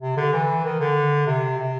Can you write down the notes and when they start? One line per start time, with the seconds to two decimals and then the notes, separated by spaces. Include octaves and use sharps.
0.02 C3
0.17 D3
0.33 E3
0.65 D#3
0.80 D3
1.27 C3
1.59 C3